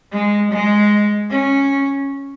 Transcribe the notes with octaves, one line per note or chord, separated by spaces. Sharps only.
G#3
G#3
C#4